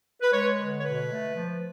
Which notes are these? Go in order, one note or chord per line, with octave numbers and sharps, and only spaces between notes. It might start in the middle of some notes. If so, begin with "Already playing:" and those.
B4
G#3 C#5
D3
C#5
B2 B4
A3
F3